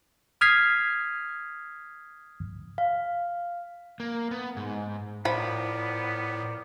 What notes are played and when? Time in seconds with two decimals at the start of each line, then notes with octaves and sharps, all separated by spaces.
0.41 D#6 F6 G#6 B6 C7
2.78 F5
4.00 A#3
4.31 B3
4.57 G#2
5.25 A2 F3 B3 A#4 C5 D5 B5